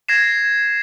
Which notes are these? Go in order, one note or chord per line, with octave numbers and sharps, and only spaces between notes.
G#6 A#6 C7 E7